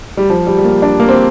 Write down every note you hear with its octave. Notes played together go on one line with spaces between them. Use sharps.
G3
F3
G3
G3
A#3
D4
A#3
C4